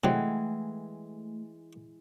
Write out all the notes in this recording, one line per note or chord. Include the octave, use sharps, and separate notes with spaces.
C3 E3 F#3 G#3 A3 F#5 G5